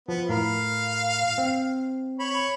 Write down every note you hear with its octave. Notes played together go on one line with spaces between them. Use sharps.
F3 B3
A2 A#4 F5 B5
C4
C#5 B5